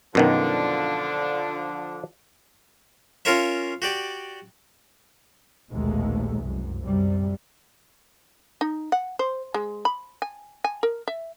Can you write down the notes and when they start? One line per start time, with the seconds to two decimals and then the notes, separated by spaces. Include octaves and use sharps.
0.15 F#2 B2 D3 D#3 F3 D4
3.25 C#4 F4 A#4 C#5 E5
3.82 F#4 G4 D5
5.71 A#1 D#2 B2 G#3 A3
6.40 C2 F#2
6.82 F#2 C3 G3
8.61 D#4
8.92 F#5
9.19 C5
9.54 G#3
9.85 B5
10.22 G#5
10.64 G#5
10.83 A#4
11.08 E5